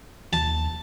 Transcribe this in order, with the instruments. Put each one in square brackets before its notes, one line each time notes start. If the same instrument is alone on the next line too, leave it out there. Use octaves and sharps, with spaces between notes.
[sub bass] D#2 [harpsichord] A5